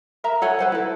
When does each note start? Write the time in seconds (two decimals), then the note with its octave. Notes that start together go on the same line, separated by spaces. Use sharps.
0.24 A#4 E5 A#5
0.42 A4 C#5 F#5 G#5
0.59 B4 C5 F#5
0.72 E4 A4